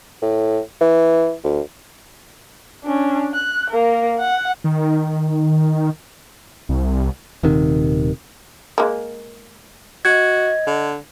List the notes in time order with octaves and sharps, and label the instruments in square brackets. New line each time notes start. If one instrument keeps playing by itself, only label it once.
[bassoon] A2
E3
D2
[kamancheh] C#4 D4
F#6
A#3 A#4
F#5
[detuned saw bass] D#3
C2
[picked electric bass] D#1 C3 D#3
[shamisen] G#3 A#3
[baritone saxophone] F#4 [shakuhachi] D#5 [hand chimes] G#6
[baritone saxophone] D3